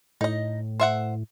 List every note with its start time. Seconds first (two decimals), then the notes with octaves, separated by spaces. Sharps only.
0.21 A2 D#4 D#5
0.80 C5 E5 F#5